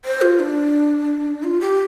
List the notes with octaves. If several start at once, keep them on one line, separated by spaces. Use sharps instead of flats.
C5
F4
D4
F4
G4